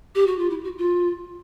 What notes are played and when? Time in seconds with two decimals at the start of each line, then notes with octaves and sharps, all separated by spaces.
0.15 G4
0.27 F#4
0.39 F4
0.50 E4
0.64 F#4
0.78 F4